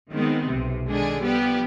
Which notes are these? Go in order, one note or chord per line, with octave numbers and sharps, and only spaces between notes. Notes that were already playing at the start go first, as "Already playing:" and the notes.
D#3 G#3 B3 C4
B1 C3
D3 D#3 G#3 D4 G#4
F3 G3 B3 G4